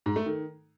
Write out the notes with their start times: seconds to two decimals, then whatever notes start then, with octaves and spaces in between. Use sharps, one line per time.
0.06 G#2
0.16 A3
0.26 D#3